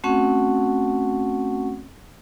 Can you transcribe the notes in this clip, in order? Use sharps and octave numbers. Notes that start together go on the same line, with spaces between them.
A3 C4 C#4 F#4 F#5 C#6